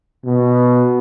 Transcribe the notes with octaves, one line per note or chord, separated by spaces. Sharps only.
B2